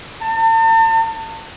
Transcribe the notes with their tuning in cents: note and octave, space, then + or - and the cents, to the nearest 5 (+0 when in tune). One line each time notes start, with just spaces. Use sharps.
A5 +40